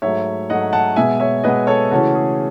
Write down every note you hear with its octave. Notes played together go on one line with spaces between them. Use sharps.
G#2 F#3 A3 C#5 E5
G#2 F#3 A3 D#5 F#5
F#5 A5
B2 G#3 B3 E5 G#5
C#5 E5
B2 G#3 B3 B4 D#5
A4 C#5
C#3 E3 A3 C#4 F#4 A4
G#4